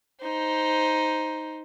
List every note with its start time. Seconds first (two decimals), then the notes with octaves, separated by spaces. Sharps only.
0.21 D#4 C5